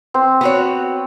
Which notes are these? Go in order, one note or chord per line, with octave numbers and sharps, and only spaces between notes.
C4
B3 F#4 C#5